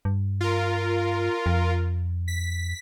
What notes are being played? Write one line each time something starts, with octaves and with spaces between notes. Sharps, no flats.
G2
F4 A#4
F2
B6